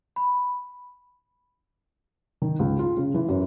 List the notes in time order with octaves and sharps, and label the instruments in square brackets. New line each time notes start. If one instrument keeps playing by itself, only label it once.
[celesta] B5
[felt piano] D#3
C#2
F4
C#3
E3
F#2